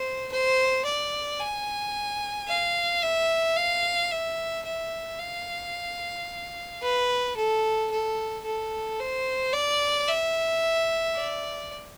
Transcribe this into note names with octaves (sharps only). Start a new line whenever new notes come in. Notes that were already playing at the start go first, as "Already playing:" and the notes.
Already playing: C5
C5
D5
G#5
F5
E5
F5
E5
E5
F5
B4
A4
A4
A4
C5
D5
E5
D5